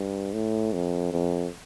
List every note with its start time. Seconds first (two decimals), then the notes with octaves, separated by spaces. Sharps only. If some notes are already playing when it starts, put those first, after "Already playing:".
Already playing: G2
0.33 A2
0.73 F2
1.13 F2